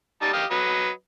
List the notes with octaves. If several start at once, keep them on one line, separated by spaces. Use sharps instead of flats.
G3 D#4 A5
G4 D#5 F5
F#3 B4 D#5